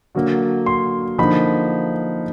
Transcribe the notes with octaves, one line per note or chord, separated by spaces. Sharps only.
D3 F#3 A#3
C6
D3 F3 A#3 D#4 B5